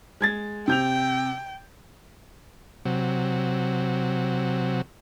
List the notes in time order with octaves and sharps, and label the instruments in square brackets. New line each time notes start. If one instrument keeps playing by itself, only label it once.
[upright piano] G#3 G#6 A6
[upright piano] C3 G6 F7 [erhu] G5
[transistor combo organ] C3 F#3